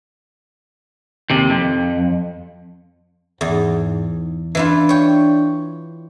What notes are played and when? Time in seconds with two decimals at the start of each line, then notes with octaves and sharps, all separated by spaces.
1.30 D#2 C3
1.50 F2
3.41 E2 G#2
4.55 E3 D4 E4 F4
4.89 C#5 G5